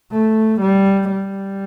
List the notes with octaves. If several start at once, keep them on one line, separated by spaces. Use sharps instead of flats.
A3
G3
G3